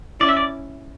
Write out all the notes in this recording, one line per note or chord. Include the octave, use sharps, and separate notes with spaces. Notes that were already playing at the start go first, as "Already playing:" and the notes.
C#4 E4 D5
E5
D5